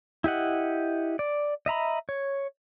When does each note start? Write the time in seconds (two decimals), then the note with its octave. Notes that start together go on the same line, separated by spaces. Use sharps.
0.24 E4 G4 D#5 F#5
1.19 D5
1.66 D#5 E5 A#5 B5
2.09 C#5